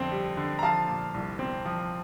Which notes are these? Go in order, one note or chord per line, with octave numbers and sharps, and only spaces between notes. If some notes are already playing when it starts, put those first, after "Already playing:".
Already playing: F2 D3 C4
G3
D3
A#5
F3 F5 A5
A#2
C2
C4
F3